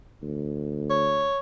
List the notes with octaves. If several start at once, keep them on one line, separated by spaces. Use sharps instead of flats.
D2
C#5